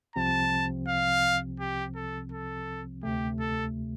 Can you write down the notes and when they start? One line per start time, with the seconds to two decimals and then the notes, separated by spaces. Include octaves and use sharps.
0.16 C2 C3 F3 C4 A5
0.88 F5
1.60 G4
1.96 A4
2.32 A4
3.03 D2 C3 A3 G4
3.40 A4